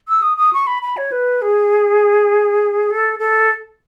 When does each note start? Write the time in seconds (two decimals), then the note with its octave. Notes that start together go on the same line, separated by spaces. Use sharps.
0.08 E6
0.22 D#6
0.37 D#6
0.53 C#6
0.67 B5
0.83 B5
0.97 C#5
1.12 B4
1.42 G#4
2.90 A4
3.19 A4